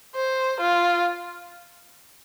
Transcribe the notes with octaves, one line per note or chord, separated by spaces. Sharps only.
C5
F4